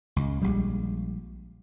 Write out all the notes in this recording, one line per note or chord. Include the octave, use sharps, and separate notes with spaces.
C#2
A#1 G3 G#3